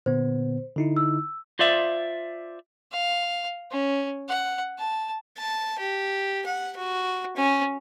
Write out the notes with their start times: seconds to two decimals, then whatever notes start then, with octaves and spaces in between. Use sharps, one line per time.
0.06 A#2 D3 B3 C5
0.76 D3 D#4 E4
0.97 E6
1.59 F4 C5 D5 E5
2.92 F5
3.71 C#4
4.28 F#5
4.78 A5
5.38 A5
5.79 G4
6.46 F#5
6.77 F#4
7.37 C#4